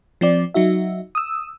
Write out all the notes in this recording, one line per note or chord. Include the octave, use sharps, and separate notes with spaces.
F3 C4 D5
F#3 D#4 F#4 E5
D#6 E6